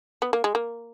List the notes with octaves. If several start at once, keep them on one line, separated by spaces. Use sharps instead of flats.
B3
A#3
G#3
A#3